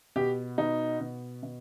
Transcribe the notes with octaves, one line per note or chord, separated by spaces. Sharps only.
B2 G4
B2 D#4
B2
B2